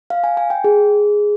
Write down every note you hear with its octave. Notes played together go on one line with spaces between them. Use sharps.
F5
G#5
G#5
G5
G#4